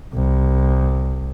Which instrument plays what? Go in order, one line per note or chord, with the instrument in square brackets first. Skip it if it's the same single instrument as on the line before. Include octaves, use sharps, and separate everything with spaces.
[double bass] C2